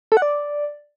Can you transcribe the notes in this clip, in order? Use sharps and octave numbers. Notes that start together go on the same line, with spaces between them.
A4
F#5
D5